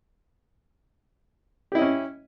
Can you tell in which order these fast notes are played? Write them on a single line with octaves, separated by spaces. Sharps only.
G4 E4 D#5 C#4